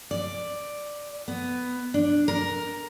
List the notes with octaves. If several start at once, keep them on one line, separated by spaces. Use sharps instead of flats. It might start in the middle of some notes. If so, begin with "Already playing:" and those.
D5
B3
D4
A#4